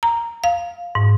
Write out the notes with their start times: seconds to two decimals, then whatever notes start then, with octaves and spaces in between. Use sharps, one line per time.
0.03 A#5
0.44 F5
0.95 G#2